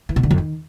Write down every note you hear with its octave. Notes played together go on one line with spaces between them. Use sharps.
E3
B2
D3
F2
D#3